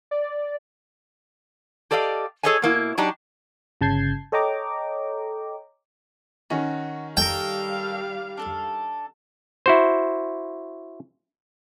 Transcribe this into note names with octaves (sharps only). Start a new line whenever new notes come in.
D5
G4 A4 D5 D#5 F5
G#4 A4 C#5 D#5 E5 G#5
B2 A#3 E4
F#3 D4 D#4 G4
G1 C#3 A5 G6 G#6 C7
A4 C#5 D#5 G5 A#5 D6
D#3 C#4 D#4 F#4
G3 A4 A#4 F5 G5
D4 A4
E4 F#4 C5